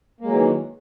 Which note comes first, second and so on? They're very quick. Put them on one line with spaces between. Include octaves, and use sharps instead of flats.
A#3 G#3 F#3 E3 D#3